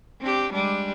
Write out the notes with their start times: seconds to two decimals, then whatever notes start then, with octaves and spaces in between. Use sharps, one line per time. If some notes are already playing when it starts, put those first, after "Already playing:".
0.21 C4 D4 G4
0.53 G3 G#3 D4